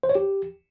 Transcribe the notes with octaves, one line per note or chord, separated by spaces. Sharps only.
C5
C#5
G4